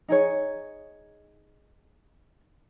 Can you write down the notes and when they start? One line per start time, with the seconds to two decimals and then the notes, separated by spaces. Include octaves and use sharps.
0.08 D#4 G#4 C#5